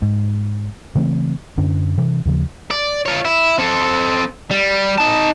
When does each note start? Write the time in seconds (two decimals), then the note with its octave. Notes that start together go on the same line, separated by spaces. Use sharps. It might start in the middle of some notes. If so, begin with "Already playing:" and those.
0.02 G#2
0.95 C#3 E3 A3 C4
1.58 F#2 D3 C#4 D4
1.98 C3 E3
2.25 D#2 C#3 F3
2.71 D5
3.06 F4 C#5
3.25 E4
3.59 C4 A4
4.51 G3
4.98 D#4 A5